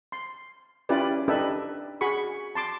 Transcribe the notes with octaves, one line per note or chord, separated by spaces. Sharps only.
C6
C#4 E4 F4 G4 B4 D5
D4 D#4 G4 A4 B4 E5
F#4 G#4 B5 C#6
A5 C6 D6